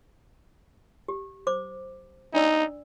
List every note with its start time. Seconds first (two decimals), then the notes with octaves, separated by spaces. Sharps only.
1.08 G4
1.47 C5 D6
2.34 D4 D#4 D5 E6